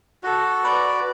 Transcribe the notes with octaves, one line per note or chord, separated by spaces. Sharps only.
F#4 A4
B4 D5